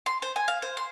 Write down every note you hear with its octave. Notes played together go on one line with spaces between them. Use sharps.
C6
C5
G#5
F5
C5
C6